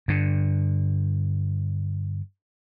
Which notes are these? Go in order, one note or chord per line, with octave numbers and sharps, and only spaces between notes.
G2 D3